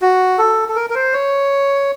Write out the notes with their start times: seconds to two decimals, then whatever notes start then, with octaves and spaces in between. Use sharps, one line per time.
0.02 F#4
0.38 A4
0.69 A4
0.76 A#4
0.90 A#4
0.95 C5
1.13 C#5